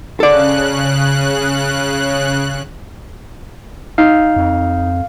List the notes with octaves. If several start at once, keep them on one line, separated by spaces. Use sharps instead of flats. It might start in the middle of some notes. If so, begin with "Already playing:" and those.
C#3 A4 D5 F#6
D#4 F5
F2